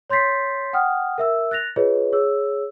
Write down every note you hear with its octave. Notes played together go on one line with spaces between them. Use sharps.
C#5 C6 G6 A6 B6 C7
F#5 G5 D#6 F6
A#4 E5 E6
F#6 A6 A#6 F7
F4 G#4 B4 C#5 D#5
G#4 C#5 E6